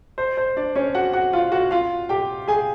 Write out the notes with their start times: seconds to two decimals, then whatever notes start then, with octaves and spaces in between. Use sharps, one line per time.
0.18 C5
0.37 C5
0.56 D4 D5
0.76 C#4 C#5
0.95 F#4 F#5
1.13 F#4 F#5
1.33 F4 F5
1.52 F#4 F#5
1.71 F4 F5
2.09 G4 G5
2.48 G#4 G#5